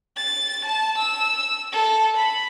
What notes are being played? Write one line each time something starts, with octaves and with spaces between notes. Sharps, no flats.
A6
A5
E6
A4
B5